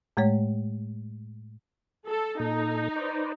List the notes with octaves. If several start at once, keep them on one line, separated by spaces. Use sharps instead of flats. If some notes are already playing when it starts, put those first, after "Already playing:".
A2 G#3 A3 C#5
A4
A#2 D#4 A4
B4 C5 D5